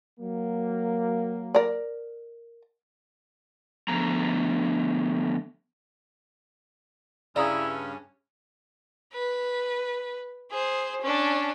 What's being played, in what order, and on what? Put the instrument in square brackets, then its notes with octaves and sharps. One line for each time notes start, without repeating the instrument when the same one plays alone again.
[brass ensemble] F#3 A#3
[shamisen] A#4 D5
[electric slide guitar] D3 F3 A3 B3 A#5
[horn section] G2 C#4 [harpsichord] C#3 [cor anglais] E4 [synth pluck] D5 A#5 D#6
[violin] B4
G#4 C5
C#4 D4